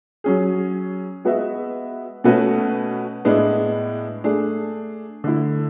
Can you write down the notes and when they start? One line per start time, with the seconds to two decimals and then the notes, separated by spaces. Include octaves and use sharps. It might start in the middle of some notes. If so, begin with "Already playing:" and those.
0.24 F#3 C#4 G#4
1.25 G#3 B3 F#4 B4 E5
2.24 B2 A3 C#4 F#4 B4
3.25 A2 G#3 B3 D4
4.24 A3 D4 G#4
5.24 D3 A3 E4